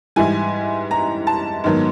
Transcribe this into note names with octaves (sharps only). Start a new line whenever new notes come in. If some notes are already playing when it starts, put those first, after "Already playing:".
G#2 E3 G3 G#5
A#5
A5
G#2 D#3 F#3 B3